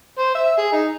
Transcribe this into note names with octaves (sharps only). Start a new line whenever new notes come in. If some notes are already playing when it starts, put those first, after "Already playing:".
C5
E5
G#4
D#4